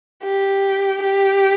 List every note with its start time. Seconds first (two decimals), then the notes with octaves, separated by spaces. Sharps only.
0.24 G4
1.03 G4